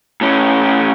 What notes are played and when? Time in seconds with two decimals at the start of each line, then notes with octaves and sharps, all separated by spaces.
0.21 A2 C#4